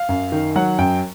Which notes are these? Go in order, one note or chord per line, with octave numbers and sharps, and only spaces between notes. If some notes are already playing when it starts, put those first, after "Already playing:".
Already playing: F5
F#2
D#3
F#3 F#5
F#2 G5